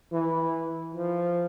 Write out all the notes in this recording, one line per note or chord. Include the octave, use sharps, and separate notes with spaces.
E3
F3